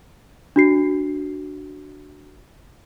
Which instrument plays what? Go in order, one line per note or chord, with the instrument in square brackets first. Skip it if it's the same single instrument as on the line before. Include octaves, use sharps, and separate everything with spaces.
[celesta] D4 F#4 C7